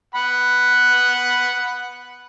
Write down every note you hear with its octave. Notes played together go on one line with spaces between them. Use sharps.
F#5 B5